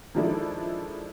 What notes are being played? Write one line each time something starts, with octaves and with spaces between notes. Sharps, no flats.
D#3 F3 G#3 D4 E4 A4